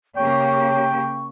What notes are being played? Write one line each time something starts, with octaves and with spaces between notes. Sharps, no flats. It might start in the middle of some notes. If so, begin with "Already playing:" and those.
C#3 A#3 G4 C#5 G5 C#6